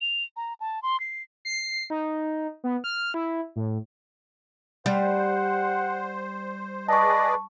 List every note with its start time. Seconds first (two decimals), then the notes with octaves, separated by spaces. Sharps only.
0.01 F7
0.36 A#5
0.60 A5
0.82 C6
1.00 C7
1.45 C7
1.90 D#4
2.64 B3
2.84 F6
3.14 E4
3.56 A2
4.86 G3 C5 F#5
6.89 G#4 B4 D5 D#5 A5 C#6